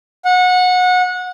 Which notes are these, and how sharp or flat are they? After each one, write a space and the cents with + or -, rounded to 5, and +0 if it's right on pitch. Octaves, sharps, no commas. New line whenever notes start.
F#5 -25